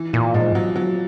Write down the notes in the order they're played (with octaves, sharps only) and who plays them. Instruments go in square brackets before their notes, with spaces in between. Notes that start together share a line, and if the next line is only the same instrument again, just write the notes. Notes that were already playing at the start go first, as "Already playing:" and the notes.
Already playing: [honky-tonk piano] E3
[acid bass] A#2 [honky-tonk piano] E3
[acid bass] G#2 [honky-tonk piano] F3
[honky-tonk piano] F#3
F#3